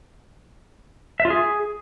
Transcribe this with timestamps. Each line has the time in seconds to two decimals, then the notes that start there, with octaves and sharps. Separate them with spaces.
1.20 E5
1.25 F4
1.30 G#4